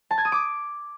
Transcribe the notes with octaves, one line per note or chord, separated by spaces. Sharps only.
A5
G#6
D#6
D6